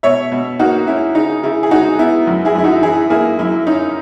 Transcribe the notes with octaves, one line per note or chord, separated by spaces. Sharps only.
B2 C#5 E5
B2
A#3 D#4 F#4
C#4 E4
C#3 D#4
C#3 E4
G#4
G#3 D#4 F#4
B3 E4
F#2
E4 G#4
F#2 E4
D#4 F#4
E3 E4 G#4
A#3 E4 G#4
F#2 E4
C#4 D#4